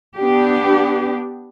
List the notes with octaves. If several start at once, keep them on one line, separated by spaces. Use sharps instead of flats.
B3 D4 G4